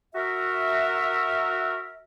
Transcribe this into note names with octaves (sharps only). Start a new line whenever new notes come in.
F#4 A#4 E5